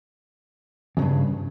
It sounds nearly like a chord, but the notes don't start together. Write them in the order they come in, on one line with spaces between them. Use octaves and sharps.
E2 C#3 G2